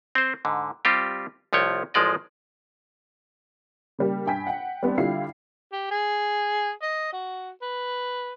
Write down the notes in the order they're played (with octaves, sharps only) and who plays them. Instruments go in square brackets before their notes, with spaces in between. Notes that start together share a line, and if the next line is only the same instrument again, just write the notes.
[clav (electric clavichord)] C4 C5
G#2 D3
G3 C4 F4 G4
C2 F3 A3 C#5 G5
A1 F3 G#3 D5 D#5
[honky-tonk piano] C#3 G3 A#3
G2 G5 G#5 B6
F#5 G5
G3 B3 C4 D4
D3 G3 E4 F4 F5 C7
[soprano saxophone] G4
G#4
D#5
F#4
B4